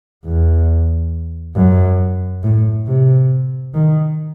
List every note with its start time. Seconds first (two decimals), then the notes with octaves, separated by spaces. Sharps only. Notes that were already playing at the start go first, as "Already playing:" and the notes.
0.25 E2
1.55 F#2
2.43 A2
2.87 C3
3.74 D#3